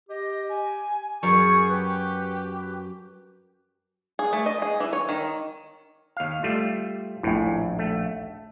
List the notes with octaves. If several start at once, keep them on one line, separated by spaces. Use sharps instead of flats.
G4 D#5
G#5
F#2 G#4 C#6
G4 B4
G#4
A3
D#5
G#4
E3
C#5
D#3
D#2 F5
G3 A3 F4
A#1 D#2 A2
A3